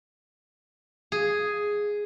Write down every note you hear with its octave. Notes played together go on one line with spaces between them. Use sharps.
G#4